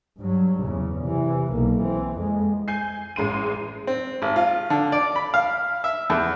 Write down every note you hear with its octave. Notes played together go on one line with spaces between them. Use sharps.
G2 F#3
E2 C#3
C3 E3
B1 A#3
E3 C4
F2 G#3
G#5 G6 C7
A1 G#3 C6 D#7
C4
G#1
F4
D3
D5
B5
F5
E5
E2